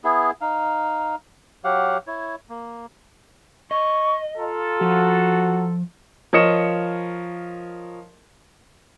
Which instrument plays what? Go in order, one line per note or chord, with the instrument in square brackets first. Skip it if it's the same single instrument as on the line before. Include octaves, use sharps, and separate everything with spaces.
[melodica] B3 E4 G#4
D#4 F5
F#3 G4 F5 F#5
E4 C#5
A#3
[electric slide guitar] D#5 [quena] C#6
[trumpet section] F4 A4 [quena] A#5
[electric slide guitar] F3 [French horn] F#4
[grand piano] F3 A#4 C#5 D#5 C#7 E7